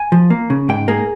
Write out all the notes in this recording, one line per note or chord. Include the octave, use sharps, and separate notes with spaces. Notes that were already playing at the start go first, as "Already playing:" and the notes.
Already playing: G#5
F3
A#3
C#3
G#2 G5
A#3 G#4